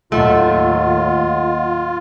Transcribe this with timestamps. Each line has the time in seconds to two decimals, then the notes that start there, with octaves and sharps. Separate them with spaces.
0.12 D#2 A2 F#3 A3 F4 D#5 F#5